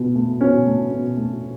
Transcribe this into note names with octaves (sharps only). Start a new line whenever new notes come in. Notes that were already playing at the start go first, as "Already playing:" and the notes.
Already playing: B2
A3
B2 C#4
A3
B2
A3